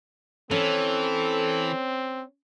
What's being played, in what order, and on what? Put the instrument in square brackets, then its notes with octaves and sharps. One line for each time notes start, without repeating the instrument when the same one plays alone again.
[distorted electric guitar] E3 [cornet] C4 [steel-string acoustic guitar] C#4 C#5 [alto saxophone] A4